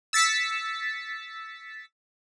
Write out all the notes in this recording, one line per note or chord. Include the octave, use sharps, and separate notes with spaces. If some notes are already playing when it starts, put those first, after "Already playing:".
E6 A6 B6 C#7